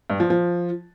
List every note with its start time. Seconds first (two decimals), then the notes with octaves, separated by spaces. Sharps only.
0.10 G2
0.20 F3
0.30 F3